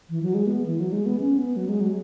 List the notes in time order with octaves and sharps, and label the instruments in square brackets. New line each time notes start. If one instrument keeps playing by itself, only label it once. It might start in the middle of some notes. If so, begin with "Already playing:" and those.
[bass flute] E3
F#3
G#3
B3
E3
F#3
G#3
B3
C#4
B3
F#3
G#3
F#3